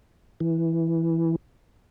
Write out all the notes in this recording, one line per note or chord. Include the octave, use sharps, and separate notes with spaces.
E3